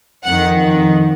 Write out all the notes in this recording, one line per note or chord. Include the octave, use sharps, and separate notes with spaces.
F2 D#3 F#5